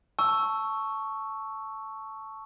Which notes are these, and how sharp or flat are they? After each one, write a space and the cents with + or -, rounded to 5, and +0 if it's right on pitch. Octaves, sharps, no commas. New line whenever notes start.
A5 +0 C#6 +0 E6 +0